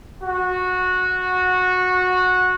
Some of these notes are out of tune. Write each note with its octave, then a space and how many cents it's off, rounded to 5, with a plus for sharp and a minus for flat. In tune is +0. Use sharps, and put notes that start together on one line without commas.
F#4 -15